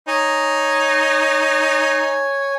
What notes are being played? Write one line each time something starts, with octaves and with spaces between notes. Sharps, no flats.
D#4 C#5 G#5